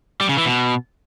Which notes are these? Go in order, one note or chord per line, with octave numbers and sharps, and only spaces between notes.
G3
C#3
E3
B2